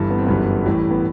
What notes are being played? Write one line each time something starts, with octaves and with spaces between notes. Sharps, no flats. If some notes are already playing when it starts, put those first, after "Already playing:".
Already playing: G1 G2 E3
B3
C4
G1 F#2 E3 G3 B3
A1 A2 E3 G3
B3